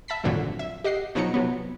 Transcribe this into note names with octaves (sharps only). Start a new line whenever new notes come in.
E5 A5 B5 B6
G#1 F2 A#2 D3 F#3
E5
G4 D#5 F#5 C7
B2 F3 F#3 D#4 A#5 C#7
C3 F#3 B3